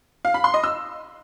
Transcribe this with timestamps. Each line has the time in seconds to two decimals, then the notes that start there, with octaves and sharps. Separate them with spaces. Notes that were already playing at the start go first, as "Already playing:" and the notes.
0.25 F5
0.34 B5
0.44 C6
0.54 D#5
0.64 E6